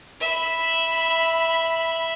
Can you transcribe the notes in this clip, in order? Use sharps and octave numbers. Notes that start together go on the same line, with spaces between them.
E5 B5